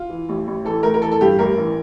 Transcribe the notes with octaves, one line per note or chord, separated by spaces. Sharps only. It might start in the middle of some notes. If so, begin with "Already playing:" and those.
Already playing: F4
E3
A1
A1
E3 A4
A3 A#4
A#4
E3 A4
A4
G2 G4
A1 A#4
E3